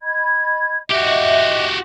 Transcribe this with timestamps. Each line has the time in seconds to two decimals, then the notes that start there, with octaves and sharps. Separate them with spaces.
0.02 D#5 B5 G#6
0.90 F#4 G4 D#5 E5